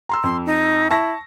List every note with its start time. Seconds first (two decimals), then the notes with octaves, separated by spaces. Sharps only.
0.09 A#5 C6 E6
0.24 F2 C6
0.46 D#4
0.91 E4 A5 C#6 A#6